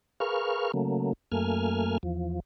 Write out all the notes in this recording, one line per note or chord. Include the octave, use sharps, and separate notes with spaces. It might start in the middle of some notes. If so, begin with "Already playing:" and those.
G#4 A#4 B4 F5 C#6 F6
C#3 F#3 A3 A#3
F#2 A3 A#3 G#5 F6
E2 F3